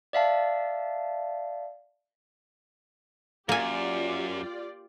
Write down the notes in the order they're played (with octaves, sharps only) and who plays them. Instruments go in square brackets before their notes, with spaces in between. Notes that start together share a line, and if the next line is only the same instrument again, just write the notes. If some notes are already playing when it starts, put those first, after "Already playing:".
[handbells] D5 E5 F5 A5
[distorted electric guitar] F#2 [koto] A#3 G#5 [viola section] F4 G4 D5